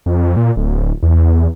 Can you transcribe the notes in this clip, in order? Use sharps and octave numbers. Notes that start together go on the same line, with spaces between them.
F2
A#2
D1
E2